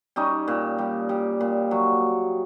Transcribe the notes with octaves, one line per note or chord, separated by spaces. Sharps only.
G3 C#4 D#4
A#2
G3
G3
A#2
F#3